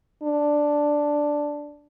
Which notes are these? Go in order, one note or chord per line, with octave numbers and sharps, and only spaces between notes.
D4